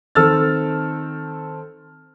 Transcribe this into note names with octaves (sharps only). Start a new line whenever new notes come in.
D#3 C4 A4 E6 F6 A6